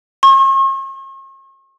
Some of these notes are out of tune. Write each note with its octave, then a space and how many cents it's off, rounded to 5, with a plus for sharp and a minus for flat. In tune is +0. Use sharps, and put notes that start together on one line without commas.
C#6 -45